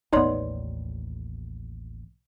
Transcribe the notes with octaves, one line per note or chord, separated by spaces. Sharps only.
A1 D#2 B3 D#4 C#5 D5 C6